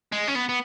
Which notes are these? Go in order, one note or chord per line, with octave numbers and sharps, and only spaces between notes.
G#3
C#4
B3
B3